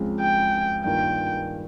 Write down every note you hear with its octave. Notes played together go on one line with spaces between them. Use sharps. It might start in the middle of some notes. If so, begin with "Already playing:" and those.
Already playing: C#2 C#3 F3 G#3 C4
G5
G2 D#3 A#3 F4 G5